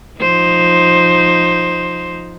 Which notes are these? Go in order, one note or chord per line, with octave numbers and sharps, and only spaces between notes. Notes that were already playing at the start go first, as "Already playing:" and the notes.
F3 D#4 C5